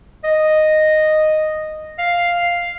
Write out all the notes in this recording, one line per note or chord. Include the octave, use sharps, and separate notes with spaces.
D#5
F5